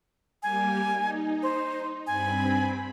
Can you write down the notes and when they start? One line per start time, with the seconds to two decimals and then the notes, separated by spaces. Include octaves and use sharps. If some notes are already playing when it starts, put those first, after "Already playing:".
0.43 G3 A#3 G4 G#5
0.93 D#4
1.43 C5
2.07 G2 C4 G#5 B5